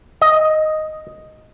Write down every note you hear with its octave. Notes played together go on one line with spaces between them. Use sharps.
D#5